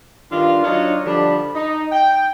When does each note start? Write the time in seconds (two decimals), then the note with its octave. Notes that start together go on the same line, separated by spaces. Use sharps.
0.31 G2 D#3 D4 F4
0.63 F#3 D4 D#4 F4 C#5 D#5
1.05 D3 F3 G3 D4 A5 B5
1.55 D#4
1.92 G5